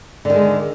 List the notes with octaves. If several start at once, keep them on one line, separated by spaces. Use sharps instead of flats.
D3 D#3 G#3